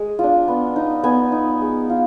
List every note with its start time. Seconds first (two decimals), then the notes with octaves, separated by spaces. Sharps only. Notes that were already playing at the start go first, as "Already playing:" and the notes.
Already playing: G#3
0.19 D4 F4
0.48 B3
0.76 D#4
1.04 B3 G#5
1.32 D#4
1.61 G#3
1.90 F4